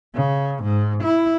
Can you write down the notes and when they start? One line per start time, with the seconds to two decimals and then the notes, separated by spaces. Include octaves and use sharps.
0.15 C#3
0.63 G#2
1.04 E4